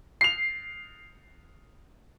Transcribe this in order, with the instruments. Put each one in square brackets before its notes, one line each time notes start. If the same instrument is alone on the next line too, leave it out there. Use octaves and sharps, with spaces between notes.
[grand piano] C7 F7